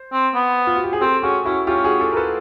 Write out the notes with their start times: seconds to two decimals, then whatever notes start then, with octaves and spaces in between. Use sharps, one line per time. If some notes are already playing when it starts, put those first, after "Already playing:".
Already playing: C5
0.13 C4
0.34 B3
0.67 F4
0.76 F#4
0.84 G4
0.93 G#4
1.01 C4 G4 A4
1.23 C#4 F#4 G#4
1.45 C#4 E4 F#4
1.67 C#4 F4 G4
1.84 F#4 G#4
2.00 G4 A4
2.13 A#4
2.16 A4 B4